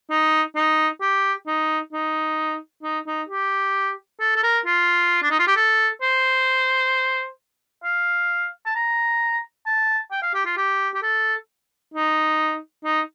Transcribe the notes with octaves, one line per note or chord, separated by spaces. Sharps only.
D#4
D#4
G4
D#4
D#4
D#4
D#4
G4
A4
A4
A#4
F4
D4
D#4
F4
G4
A4
C5
F5
A5
A#5
A5
G5
F5
G4
F4
G4
G4
A4
D#4
D#4